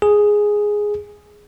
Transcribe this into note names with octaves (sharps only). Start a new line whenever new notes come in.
G#4